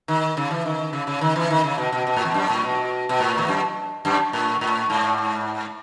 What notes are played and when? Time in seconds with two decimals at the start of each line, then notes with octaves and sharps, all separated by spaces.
0.08 D#3
0.37 C#3
0.51 E3
0.66 D#3
0.93 C#3
1.07 C#3
1.21 D#3
1.36 E3
1.50 D#3
1.64 C#3
1.78 B2
1.93 B2
2.07 B2
2.16 A2
2.25 E2
2.34 F#2
2.50 A2
2.64 B2
3.09 B2
3.20 A2
3.38 E2
3.48 F#2
4.05 F#2
4.33 A2
4.61 A2
4.90 G#2